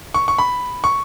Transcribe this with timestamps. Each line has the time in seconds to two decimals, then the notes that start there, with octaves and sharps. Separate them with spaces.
0.14 C#6
0.28 C#6
0.38 B5
0.84 C#6